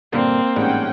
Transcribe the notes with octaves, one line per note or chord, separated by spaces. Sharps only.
G2 A#2 D3 A#3 C4
A1 G#2 G3 C#4 F#5 G5